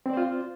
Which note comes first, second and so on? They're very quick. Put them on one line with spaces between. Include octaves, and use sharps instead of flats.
C4 D5 C5 F4